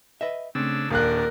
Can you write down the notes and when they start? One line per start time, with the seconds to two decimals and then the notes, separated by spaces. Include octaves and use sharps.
0.21 B4 D#5 E5
0.55 C#3 A3 C4 D4 E6
0.90 D#1 A#2 D4 A#4 F5 F#6